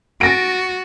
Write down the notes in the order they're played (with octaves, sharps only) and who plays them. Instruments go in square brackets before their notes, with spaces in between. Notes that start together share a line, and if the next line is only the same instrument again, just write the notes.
[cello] F#4 [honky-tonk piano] A6 A#6 D7